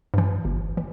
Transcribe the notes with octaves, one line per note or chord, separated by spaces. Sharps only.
G2 E3
G1
E3